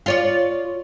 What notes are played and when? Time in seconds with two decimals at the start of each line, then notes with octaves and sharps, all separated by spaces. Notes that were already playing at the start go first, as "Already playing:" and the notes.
0.06 F4 C#5 D5